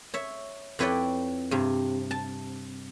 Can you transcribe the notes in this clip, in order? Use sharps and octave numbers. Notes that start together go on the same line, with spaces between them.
C#5 E5
F2 E4 B4 C#5 D5 G5
G2 C3
A5